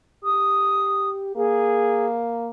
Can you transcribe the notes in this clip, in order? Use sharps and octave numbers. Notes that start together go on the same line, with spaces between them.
G4 D#6
A#3 G#4